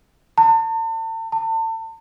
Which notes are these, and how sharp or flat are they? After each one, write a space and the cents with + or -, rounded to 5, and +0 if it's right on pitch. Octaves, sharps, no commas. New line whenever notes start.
A5 +40
A5 +35